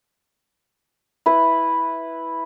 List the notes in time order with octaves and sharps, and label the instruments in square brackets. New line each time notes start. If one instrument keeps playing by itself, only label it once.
[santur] E4 B4